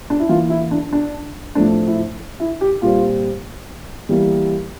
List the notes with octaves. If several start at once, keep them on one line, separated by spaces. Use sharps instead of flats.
D4
E4
E3 A#3 F4
E4
D4
D4
A2 F3 A3 C4 D4
E4
E4
G4
A#2 G3 C4 F4
E3 G3 A#3